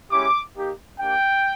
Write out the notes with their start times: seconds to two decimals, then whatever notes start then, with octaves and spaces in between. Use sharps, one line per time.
0.11 G#3 C#4 E4 G4 D6
0.55 A#3 D#4 G4
1.00 A#3 D4 G4 G5